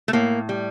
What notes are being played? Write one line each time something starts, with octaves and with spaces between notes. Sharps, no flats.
A3
A2 A#3
G3